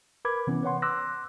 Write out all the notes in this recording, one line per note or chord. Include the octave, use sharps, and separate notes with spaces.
A#4 B4 B5 D6 G#6
C3 E3 B3 C#4
B4 C#5 F#5 C6
C6 D6 E6 F#6 A#6